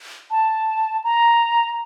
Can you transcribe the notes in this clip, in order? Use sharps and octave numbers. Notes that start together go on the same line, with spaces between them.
A5
A#5